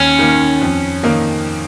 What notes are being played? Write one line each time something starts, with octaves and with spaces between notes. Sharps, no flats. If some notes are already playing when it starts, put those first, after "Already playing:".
Already playing: D#2 C#4
D#3 A#3
F2
D#3 A#3 D#4